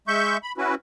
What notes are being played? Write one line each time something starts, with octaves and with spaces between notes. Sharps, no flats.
G#3 E5 C#6 G6
B5
C#4 E4 F#4 B4